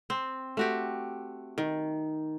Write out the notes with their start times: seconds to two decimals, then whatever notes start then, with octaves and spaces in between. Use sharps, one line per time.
0.10 C4
0.57 A3 F#4 G4
1.58 D#3